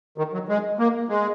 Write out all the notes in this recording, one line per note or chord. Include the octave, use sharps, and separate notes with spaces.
D#3
F#3
G#3
A#3
G#3